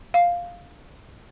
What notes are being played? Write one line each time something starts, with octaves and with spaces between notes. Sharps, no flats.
F5